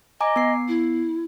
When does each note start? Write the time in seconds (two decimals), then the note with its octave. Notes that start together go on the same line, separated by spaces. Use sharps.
0.21 D#5 G#5 A#5 D6
0.36 B3 C7
0.68 E4